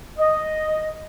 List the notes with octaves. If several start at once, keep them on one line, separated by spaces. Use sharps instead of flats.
D#5